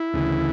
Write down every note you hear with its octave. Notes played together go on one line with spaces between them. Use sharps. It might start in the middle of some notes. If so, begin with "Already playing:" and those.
Already playing: E4
D2 C#3 E3